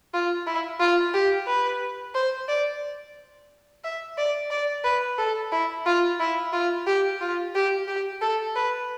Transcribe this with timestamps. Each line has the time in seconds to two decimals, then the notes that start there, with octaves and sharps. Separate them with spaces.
0.14 F4
0.47 E4
0.80 F4
1.14 G4
1.47 B4
2.15 C5
2.48 D5
3.84 E5
4.18 D5
4.50 D5
4.84 B4
5.18 A4
5.52 E4
5.86 F4
6.20 E4
6.53 F4
6.87 G4
7.21 F4
7.55 G4
7.88 G4
8.21 A4
8.56 B4